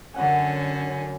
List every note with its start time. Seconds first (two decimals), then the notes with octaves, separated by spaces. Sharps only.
0.14 F#2 D3 C#4 F#5 G#5